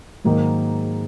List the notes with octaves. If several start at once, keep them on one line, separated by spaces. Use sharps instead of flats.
G#2 D#3 F#3 A#3